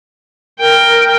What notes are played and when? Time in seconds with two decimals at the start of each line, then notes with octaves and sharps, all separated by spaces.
0.59 A#4 G5